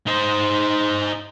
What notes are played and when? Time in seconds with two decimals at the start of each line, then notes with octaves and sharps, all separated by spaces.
0.07 D#4 C5